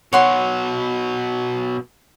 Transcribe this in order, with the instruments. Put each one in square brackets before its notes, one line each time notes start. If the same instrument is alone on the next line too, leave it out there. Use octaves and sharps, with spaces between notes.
[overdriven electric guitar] B2 F#3 [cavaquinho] C#5 F#5 C6